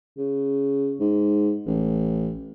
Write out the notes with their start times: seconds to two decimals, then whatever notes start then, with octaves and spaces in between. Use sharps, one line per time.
0.17 C#3
1.00 G#2
1.66 A1